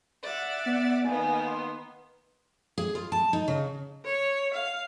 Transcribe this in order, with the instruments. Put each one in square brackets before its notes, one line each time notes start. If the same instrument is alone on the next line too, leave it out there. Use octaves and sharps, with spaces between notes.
[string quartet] D5 E5 F#5
[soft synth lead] B3
[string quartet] D#3 A#3 B3 [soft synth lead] G#5
[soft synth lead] C6
[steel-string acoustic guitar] G#4
F4
A5
D#4
C#3
[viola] C#5
F5